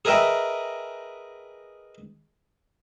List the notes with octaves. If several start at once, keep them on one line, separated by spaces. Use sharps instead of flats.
G#4 A#4 B4 D#5 E5 G5